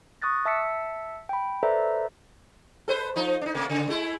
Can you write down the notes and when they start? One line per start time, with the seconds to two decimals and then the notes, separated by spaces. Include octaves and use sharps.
0.22 C#6 D#6 F#6 A6 A#6
0.45 E5 A5 E6 B6 C#7
1.29 G5 B5
1.63 A4 B4 C5 D5 E5 A#5
2.88 A4 B4 C5
3.16 F3 D#4
3.41 D4 D#4
3.55 C3 A3 A#3
3.69 C#3
3.87 G#3 A3 E4